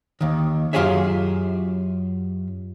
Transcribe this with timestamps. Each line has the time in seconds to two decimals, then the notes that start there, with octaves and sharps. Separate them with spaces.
0.21 D#2 D#3
0.73 F#2 F4 G4 G#4 C#5 E5